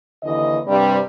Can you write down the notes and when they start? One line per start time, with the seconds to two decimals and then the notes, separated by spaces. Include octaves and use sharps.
0.24 D#2 D3 E3 D#5
0.68 G2 C3 G3